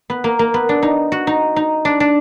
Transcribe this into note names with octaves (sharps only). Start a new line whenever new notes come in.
B3
A#3
A#3
B3
D4
D#4
F#4
D#4
D#4
D4
D4